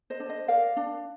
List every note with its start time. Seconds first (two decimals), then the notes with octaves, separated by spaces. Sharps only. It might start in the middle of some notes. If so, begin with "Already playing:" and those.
0.10 C5 D#5
0.20 D4
0.29 C5 D#5
0.48 A#4 D5 F5
0.77 D4